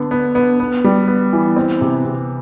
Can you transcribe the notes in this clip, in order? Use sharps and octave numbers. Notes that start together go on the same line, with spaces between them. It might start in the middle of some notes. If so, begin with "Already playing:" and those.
Already playing: D3 B3
B3
B3
B3
G3
B3
E3
C4
C3
C3